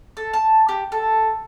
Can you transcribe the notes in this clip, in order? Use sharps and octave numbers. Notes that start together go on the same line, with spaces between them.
A4
A5
G4
A4